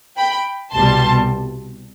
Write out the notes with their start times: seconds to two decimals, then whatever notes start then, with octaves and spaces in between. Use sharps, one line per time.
0.17 G5 B5
0.73 C2 B2 G3 A5 C6